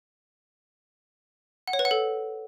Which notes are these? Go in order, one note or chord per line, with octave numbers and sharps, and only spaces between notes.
F#5
C#5
B4
F#5
A4